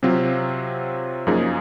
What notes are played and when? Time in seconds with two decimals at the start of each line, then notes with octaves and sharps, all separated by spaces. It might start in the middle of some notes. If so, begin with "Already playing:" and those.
0.03 C3 F#3 C4 F4
1.27 F#2 F3 A#3 D#4 G#4